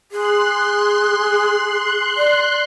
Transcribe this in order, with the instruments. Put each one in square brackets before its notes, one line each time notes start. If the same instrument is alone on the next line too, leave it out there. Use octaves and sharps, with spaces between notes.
[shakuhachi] G#4 [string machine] C6 F#6
[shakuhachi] D5